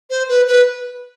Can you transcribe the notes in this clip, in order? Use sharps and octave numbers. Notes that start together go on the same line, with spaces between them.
C5
B4
B4